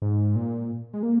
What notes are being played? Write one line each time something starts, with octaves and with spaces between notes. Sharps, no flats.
G#2
A#2
G#3
A#3